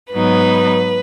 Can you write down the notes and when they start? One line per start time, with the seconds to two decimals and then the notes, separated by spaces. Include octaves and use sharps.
0.13 G#2 F#3 B3 D#4 B4